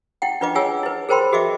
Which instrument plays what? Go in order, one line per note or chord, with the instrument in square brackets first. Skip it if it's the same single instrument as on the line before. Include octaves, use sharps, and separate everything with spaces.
[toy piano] E4 F#5 G5
D4 F4 B4 D#5 D6
F4 G#4 C#5 F#5 G#5 E6
E4 B4
G#4 A#4 C5 G5 B5 C6
F#4 G#4 D#5 E5 D6